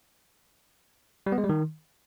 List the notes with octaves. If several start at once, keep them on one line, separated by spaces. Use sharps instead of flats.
G3
B3
G#3
G3
D#3